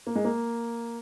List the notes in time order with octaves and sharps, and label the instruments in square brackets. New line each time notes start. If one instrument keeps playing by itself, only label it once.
[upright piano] A#3
G#3
A#3